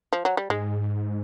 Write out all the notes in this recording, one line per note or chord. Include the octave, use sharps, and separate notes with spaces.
F3
F#3
G3
G#2 G#3